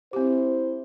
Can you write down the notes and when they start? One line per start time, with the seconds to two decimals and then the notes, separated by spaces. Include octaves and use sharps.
0.13 C4 E4 G4 C5